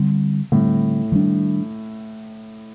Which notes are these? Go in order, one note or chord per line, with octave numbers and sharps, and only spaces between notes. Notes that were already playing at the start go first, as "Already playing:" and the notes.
Already playing: D3 G3 C4
A2 D3 G3 C4
D#3 G3 D4